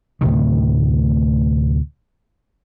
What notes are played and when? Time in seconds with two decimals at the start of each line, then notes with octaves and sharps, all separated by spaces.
0.21 D2 A2 C3 D#3